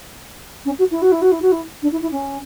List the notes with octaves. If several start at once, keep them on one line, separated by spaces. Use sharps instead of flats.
C#4
F#4
E4
F#4
E4
F#4
E4
F#4
E4
D4
E4
E4
C#4